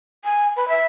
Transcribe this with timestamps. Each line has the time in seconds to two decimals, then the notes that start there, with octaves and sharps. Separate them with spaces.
0.24 G#5
0.56 B4
0.68 E5